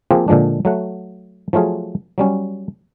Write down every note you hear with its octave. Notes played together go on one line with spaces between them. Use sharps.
F3 A#3 C4 F4 G4 G#4
A#2 D3 F3 G#3 D4
F#3 A3 F#5
F3 F#3 A3 F4 G#4
F#3 G3 C#4